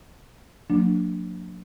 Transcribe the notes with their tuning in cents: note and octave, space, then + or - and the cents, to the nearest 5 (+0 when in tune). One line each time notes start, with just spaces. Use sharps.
F#3 -40 A#3 -25 D4 +0